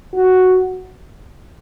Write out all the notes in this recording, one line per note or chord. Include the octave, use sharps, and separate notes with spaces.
F#4